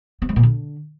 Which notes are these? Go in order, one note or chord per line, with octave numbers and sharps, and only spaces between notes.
B3
G#3
A#2
D3